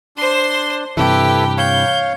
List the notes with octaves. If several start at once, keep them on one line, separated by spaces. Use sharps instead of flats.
D4 C5 C6
G2 C3 E3 E4 G4 A4 B4
C#5 F5 G6